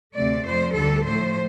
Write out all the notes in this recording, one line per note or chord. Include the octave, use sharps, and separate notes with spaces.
D2 C3 A3 D5
F2 F3 A3 C5
D2 D3 G3 A4
A2 F3 A3 C5